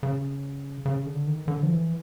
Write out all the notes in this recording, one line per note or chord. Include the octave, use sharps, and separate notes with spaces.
C#3
C#3
D3
D#3
D3
F3
E3